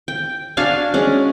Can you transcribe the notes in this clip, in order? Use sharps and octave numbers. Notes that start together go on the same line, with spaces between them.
G5
D4 F#4 F5 G#5
G#3 C#4